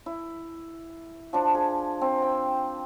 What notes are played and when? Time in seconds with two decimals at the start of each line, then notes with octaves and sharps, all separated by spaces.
0.06 E4
1.33 F3 D4
1.55 G#4
2.01 C4
2.22 G5